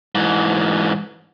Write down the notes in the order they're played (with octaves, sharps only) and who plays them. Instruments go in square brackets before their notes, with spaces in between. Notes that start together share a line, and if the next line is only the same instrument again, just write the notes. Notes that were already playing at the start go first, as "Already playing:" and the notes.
[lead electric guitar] G#2 E3